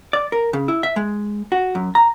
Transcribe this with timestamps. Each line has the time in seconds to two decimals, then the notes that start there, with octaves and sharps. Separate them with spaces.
0.13 D5
0.32 A#4
0.53 C#3
0.68 E4
0.83 E5
0.96 G#3
1.52 F#4
1.75 F#2
1.95 A#5